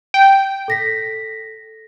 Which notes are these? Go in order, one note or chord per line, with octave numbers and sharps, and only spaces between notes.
G5
A4 A#6 B6